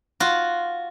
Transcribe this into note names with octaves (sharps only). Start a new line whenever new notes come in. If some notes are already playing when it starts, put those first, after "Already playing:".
F4 F#4